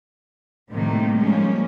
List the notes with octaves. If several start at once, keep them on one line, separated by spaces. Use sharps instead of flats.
A2 C3 D#3 G3 A3 A#3
F3 G3 G#3 A#3 C#4